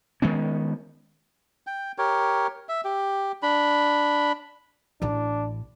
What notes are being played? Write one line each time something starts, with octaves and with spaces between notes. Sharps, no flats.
D#3 G#3 B3 C#4
G5
G4 A#4 C#5
E5
G4
D4 B5
A1 D4 E4